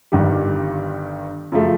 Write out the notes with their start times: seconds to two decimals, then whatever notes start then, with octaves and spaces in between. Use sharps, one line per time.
0.12 G1 G2 D#3 G3
1.52 F#2 C#3 F3 A3